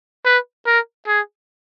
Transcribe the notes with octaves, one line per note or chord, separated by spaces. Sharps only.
B4
A#4
G#4